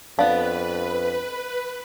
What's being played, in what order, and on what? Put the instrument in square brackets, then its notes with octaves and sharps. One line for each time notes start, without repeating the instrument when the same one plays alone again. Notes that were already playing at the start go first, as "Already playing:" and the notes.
[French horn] F2 [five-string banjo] B3 D4 [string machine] B4 [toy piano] F5